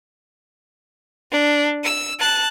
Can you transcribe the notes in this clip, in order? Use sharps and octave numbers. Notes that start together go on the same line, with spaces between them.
D4
E6
A5 F#6